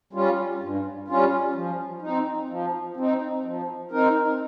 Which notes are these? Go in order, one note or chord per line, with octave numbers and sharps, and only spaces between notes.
G3 C#4 F4
G2
G3 C#4 F4
F3
D#4
C4
F3
C4 D#4
F3
C4 D#4 A#4